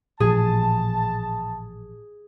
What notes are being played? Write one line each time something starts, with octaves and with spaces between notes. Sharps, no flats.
A1 A#2 F3 G#4 A5